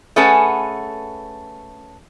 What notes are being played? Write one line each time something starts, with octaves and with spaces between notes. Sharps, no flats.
A3 C#4 G#4 B4 F#5 A5